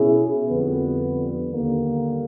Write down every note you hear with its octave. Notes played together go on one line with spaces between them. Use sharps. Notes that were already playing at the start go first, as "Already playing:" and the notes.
Already playing: B2 C#4 E4 G#4
F2 D3 G3 B3
D#2 D3 G3 A#3